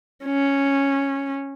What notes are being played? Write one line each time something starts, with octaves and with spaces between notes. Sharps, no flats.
C#4